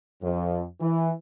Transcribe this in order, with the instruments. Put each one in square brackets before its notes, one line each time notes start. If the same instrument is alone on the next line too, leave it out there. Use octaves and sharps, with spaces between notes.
[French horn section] F2
E3